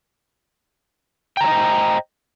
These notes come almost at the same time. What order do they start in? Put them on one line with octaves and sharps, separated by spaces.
G5 A#5 C#5 D#5 C5